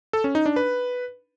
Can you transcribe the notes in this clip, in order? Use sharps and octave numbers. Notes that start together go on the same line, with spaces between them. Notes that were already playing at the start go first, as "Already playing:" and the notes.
A4
C#4
D#4
D4
B4